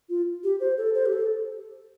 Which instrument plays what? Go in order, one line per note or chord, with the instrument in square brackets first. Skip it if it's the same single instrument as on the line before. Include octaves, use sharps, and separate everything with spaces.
[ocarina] F4
G4
C5
A4
C5
G4
A4